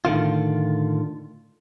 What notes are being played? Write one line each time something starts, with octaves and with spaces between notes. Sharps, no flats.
A2 D3 D#3 F4